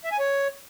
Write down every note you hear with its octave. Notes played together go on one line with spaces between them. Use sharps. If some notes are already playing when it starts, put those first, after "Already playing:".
E5
G#5
C#5